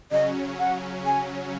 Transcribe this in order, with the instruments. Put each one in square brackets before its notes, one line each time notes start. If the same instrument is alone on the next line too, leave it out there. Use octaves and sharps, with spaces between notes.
[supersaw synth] C#3 F#3 C#4 [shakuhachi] D#5
[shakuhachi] F#5
G#5